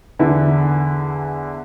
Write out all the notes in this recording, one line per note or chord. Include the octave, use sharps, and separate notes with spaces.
E2 D3 E4 B4